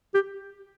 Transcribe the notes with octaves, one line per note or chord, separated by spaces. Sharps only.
G4